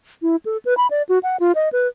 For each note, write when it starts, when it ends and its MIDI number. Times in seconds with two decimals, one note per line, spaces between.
0.22 0.36 64
0.45 0.57 69
0.65 0.76 71
0.77 0.87 83
0.90 1.03 74
1.09 1.19 66
1.23 1.37 78
1.40 1.52 65
1.55 1.69 75
1.73 1.88 71